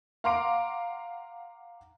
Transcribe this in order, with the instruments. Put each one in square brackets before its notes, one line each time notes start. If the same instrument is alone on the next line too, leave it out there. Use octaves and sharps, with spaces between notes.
[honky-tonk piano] F5 F#5 A#5 C6 D6 D7